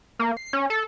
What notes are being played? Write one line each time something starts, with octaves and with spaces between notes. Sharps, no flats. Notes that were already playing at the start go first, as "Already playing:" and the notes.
A#3
C7
C#4
A4